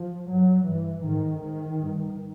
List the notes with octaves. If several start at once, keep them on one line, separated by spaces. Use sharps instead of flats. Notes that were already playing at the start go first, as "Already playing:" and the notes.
Already playing: F3
G2 F#3
G2 E3
G#2 D#3
G#2 D#3
G2